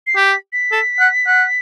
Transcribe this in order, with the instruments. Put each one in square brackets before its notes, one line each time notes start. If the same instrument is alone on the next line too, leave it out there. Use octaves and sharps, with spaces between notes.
[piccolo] C7
[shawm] G4 [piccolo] B6
[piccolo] B6
[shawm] A4
F#5
F#5